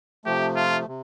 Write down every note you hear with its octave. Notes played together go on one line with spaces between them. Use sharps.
C3 F3 A3 G4
F4
C3